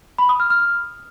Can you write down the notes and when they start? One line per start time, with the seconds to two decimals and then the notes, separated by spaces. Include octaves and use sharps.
0.18 B5
0.29 D#6
0.40 F6
0.50 F6